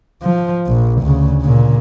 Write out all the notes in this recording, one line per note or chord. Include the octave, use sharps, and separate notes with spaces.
F3
A#1
D2 C#3
A#2 C#3